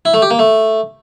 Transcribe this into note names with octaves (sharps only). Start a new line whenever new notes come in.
E4
A3
G4
A#3
A3